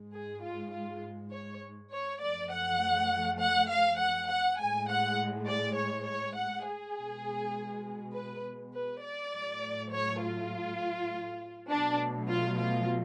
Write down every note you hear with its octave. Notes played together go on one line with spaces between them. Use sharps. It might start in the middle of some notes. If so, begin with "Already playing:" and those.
Already playing: G#2 G#3
G#4
F4
F4
C#5
C#5
F#2 F3 A3 D5
F#5
F#5
F5
F#5
F#5
A2 G#3 G#5
F#5
D5
C#5
C#5
F#5
G#4
B2 G#3
B4
B4
D5
A2 F#3 A3
C#5
F4
B2 F#3 A3 D4
F4
F4